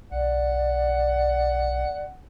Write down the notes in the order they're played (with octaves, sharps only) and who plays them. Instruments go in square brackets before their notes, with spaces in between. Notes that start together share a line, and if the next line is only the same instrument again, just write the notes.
[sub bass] B1 [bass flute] D5 [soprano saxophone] F#5